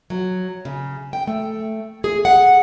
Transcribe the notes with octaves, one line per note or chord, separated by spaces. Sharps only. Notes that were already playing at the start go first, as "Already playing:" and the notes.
F#3
C#3
G5
A3
G#4
F#5